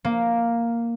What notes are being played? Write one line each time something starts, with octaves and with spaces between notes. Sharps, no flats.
A#3